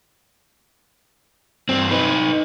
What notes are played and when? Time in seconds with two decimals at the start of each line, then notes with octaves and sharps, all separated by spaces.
1.69 G2 C4
1.91 D#4 B4